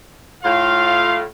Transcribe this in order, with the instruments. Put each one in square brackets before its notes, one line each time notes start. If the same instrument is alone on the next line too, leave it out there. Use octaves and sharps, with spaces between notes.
[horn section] A2 F4 F5